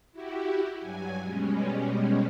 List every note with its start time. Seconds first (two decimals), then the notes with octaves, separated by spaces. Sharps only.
0.12 E4 F#4 G4
0.78 G2 F#3 G#5
1.22 B2 G3 G#3 C#4